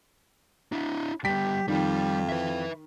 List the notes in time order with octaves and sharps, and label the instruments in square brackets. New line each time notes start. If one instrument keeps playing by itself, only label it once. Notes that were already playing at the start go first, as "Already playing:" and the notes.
[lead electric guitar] D4 E4
[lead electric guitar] G3 B3 [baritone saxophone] G4 [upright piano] B6
[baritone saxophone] F2 [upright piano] D#3 [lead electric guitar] G3
[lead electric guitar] B4 E5